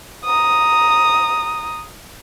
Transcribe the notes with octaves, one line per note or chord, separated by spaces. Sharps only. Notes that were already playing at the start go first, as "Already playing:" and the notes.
A#5 D#6